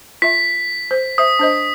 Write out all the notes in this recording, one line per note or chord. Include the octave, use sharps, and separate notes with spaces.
F4 E5 B6
C5
C5 E5 D#6
D4 C5 D#5